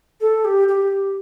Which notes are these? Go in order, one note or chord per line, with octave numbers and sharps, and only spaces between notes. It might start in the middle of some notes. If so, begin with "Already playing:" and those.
A4
G4
G4